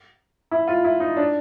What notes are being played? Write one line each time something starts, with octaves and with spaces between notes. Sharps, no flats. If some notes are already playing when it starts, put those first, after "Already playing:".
E4
F4
E4
D#4
D4